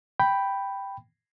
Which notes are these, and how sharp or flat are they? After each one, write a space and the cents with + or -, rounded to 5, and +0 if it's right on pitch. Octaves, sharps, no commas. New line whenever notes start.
G5 +0 B5 +0